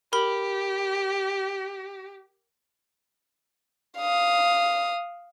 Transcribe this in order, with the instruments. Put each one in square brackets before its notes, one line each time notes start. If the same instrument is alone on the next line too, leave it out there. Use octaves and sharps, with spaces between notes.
[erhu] G4 [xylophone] A#4 B5 F#7
[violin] F5 D#6